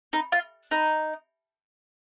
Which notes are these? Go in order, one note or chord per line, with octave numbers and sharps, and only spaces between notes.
D#4
F4
D#4